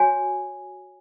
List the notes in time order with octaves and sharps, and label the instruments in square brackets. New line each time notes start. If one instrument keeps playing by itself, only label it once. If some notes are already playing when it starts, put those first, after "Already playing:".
Already playing: [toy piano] F#4 C#5 G#5